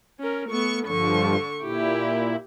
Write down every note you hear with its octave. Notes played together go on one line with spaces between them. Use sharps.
C#4 A#4
A3 B3 C#6
G2 D3 F3 C#6
A#2 E4 G4